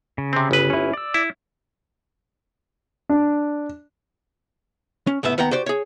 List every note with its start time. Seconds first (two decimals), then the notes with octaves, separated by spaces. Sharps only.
0.18 C#3
0.33 C3 C4
0.51 G1 B4
0.70 C#4 E4
0.93 D5 E6
1.14 E4
3.09 D4
5.07 C#4
5.23 C#2 A2 B3 E5
5.38 D#2 B3 F#5 G5 A#5
5.51 F#4 G4 C5 D5
5.66 G#4 C#5